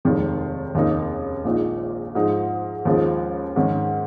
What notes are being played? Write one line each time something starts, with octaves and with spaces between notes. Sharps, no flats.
F1 D#2 D#3 G#3
F1 D#2 C#3 A#3 D#4
A#1 A#2 G#3 D#4
G#2 F3 G#3 D#4
D#2 C#3 F3 G#3 D#4
G#2 D#3 C#4